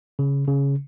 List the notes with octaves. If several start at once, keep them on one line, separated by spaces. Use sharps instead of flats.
C#3
C#3